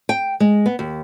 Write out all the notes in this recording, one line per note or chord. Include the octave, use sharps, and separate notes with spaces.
G5
G#3
B3
D#2